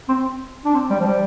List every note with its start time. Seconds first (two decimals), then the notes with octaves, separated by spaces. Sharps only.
0.08 C4
0.65 D4
0.74 C4
0.90 G3
0.99 F3
1.07 G3